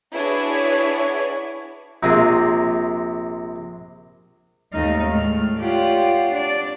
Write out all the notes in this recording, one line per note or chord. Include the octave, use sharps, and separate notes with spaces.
D4 E4 F#4 G#4 B4 C#5
A#1 C3 G#3 A#3 G4 D#6
D#2 G#2 A3 D#4 F6
A2 G#3 A3 F6
F4 G4 C#5 D5 F#5
D4 D5